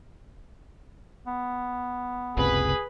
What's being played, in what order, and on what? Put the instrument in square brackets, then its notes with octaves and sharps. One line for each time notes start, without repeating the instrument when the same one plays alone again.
[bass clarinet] B3
[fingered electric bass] F#1 C#2 C3 [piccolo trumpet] G#4 [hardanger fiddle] B4 B5